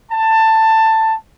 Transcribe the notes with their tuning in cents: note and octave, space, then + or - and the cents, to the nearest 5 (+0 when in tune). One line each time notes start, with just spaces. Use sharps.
A5 +15